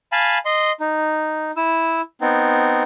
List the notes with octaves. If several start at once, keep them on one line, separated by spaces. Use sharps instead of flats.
F5 G#5 A5 B5
D#5 C6
D#4
E4 E6
B3 C4 D#4